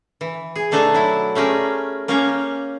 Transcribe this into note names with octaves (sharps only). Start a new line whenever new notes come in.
E3
G#4
B2 A3 D4 D#4 A4 G#5
F#3 E4
A3 C#4 G4 G#4 A#4
A#3 C#4 G4 C#5 F5 A#5